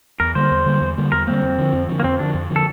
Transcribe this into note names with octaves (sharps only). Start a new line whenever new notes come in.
E2 A#4
D3 G3 A#3 C5
E2
D3 G3 A#3
E2
D3 G3 A#3
E2 A#4
D3 G3 A#3 C4
F2
D3 F3
F2
D3 F3
A#3
F2 C4
D3 F3 D4
F2
D3 F3
A4